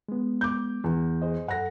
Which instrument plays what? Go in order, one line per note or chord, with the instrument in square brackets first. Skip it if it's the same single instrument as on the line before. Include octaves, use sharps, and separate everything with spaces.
[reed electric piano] G#3 B3
[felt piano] D6 G6
E2
[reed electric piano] G#4 C5 D#5
[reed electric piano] F#2 A4 [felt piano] F#5 A#6